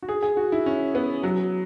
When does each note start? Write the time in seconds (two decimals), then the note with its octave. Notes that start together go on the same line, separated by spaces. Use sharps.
0.02 F#4
0.09 G#4
0.22 G#4
0.37 F#4
0.52 E4
0.66 C#4
0.95 B3
1.23 F#3